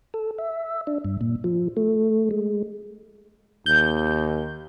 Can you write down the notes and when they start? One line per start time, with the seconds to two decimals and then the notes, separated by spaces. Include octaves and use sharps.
0.14 A4
0.38 E5
0.87 D4
1.05 G2
1.21 A#2
1.44 F3
1.77 A3
2.31 G#3
3.66 D#2 G6